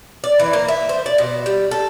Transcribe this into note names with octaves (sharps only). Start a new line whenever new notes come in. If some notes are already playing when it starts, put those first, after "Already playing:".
D5
E3
A#3
E5
C5
D5
B2
G3
A4